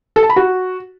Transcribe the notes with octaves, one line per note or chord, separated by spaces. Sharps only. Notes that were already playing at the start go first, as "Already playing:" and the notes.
A4
A5
B5
F#4